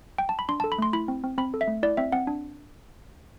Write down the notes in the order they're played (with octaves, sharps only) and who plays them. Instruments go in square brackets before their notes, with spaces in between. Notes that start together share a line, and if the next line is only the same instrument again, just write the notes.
[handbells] G5
A5
B5
D4 C6
A5
A4
B5
A3 C6
E4 B5
C4
C4
C4 B5
A4
E5
A3
E4 D5
C4 E5
C4 F#5
D4